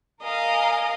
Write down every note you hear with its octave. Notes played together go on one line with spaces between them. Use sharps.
A#4 D#5 F5 G#5